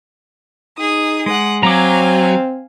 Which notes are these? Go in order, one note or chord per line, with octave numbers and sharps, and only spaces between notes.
D#4 G#4 D#6
G#3 F#5 D#6
F#3 C4 F5 G#5 A#5 D6